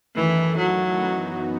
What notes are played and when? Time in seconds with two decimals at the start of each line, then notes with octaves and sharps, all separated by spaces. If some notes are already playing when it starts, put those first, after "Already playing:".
0.15 F#2 D#3 E3 A3 E4 A4
0.58 F#3
0.99 F#2 E3 B3 D#4 F#4